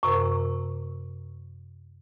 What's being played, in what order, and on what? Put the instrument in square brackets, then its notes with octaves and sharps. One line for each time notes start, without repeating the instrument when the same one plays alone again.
[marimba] F#2 C3 A#4 [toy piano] C#6